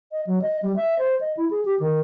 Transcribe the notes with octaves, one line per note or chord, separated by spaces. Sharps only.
D#5
F#3
D#5
G3
E5
C5
D#5
E4
G#4
G4
D#3